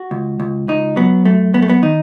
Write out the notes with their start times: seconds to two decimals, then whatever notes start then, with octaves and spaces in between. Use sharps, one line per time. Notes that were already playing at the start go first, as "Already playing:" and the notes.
Already playing: F#4
0.11 C#2
0.40 C#2
0.68 C#2 D#4
0.96 F#3 B3
1.25 F#2 A3
1.54 F#2 B3
1.62 A3
1.70 B3
1.82 D#3 D#4